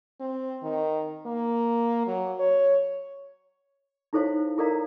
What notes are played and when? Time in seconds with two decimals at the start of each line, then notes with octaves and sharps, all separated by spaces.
0.20 C4
0.63 D#3
1.26 A#3
2.07 F#3
2.39 C#5
4.13 D#4 E4 A4 C5 C#5 F5
4.58 E4 A4 A#4 D5 F5 A#5